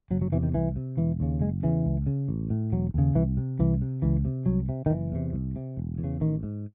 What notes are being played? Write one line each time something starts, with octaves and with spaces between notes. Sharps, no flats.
F#1 F#3
F#3
E2 C3 E3
D#3
C2 E3
C3
E1 E3
D#2 C#3
F#1 G#3
E2 C#3 E3
C#2
C#3
A1
A2
E1 F#3
D#2 C#3
C2 E3
C3
C2 E3
C3
C#2 E3
C3
C2 F#3
C3
D#3
F#1 E3
E2 C3
C2
C3
E1
E2
C#3
A1 D#3
G#2